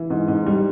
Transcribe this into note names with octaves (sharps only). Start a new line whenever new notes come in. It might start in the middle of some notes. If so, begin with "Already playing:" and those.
Already playing: E3
G#2
G#2
G3